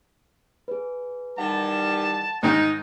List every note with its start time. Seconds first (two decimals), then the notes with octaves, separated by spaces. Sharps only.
0.68 G#4 B4
1.38 D#3 E3 G3 F#5 A5
2.43 G#2 D#3 D#4